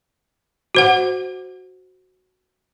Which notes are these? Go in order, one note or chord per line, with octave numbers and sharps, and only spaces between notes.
F#4 C5 F#5